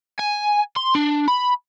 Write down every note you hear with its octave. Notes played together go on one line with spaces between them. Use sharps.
G#5
C6
D4
B5